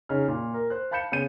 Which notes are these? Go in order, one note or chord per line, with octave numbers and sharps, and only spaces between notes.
C#3 D#4 F6
A#2
A#4
C5 F#6
F5 A5 B5 G6 C#7 E7
C#3 B3 G6 D#7